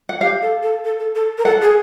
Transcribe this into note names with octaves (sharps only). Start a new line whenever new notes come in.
F#5
G4 F5
A4
A4
A4
A4
A4
A#4
A4 F#5
G#4